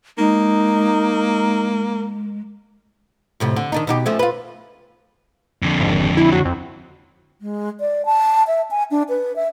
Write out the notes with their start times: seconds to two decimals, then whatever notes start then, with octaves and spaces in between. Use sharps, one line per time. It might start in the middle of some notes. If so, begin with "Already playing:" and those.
0.18 G#3 A#3 D#4
3.40 F2 A2 C3
3.56 D3
3.72 D#3 D4 D#4
3.87 B2 D#4 G4
4.06 F3 A3 C#4
4.19 F4 B4
5.62 F2 D3
5.80 G#1
6.17 E4
6.32 F#3
6.45 F2
7.40 G#3
7.80 D5
8.06 A5
8.47 E5
8.71 G#5
8.91 D4
9.09 B4
9.36 E5